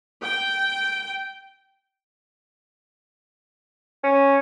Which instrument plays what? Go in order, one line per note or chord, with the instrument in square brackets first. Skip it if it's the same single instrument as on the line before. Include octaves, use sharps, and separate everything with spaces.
[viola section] G5
[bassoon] C#4